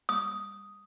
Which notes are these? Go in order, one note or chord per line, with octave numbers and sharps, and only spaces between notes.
D#6